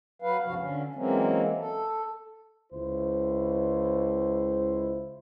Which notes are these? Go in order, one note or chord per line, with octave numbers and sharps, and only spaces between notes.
F#3 B4 F5
D2 G2 C3 F3 F#4 F5
D3 C#4
E3 F#3 G#3 A#3 C4 C#4
A4
C#2 E4 C5